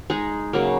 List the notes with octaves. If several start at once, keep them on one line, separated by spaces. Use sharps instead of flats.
G#3 D#4 G#4
C#3 F#3 A#3